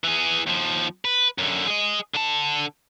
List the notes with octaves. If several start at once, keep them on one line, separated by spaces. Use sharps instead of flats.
E3 G#4
D#2 F3
B4
F#2 D3
G#4 D#5
D3 A5